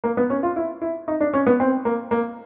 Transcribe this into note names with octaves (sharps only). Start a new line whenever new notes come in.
A#3
B3
C#4
F4
E4
E4
D#4
D4
C#4
B3
C4
A#3
A#3